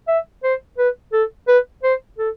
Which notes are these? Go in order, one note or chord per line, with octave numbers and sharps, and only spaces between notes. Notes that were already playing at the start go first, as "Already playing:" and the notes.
E5
C5
B4
A4
B4
C5
A4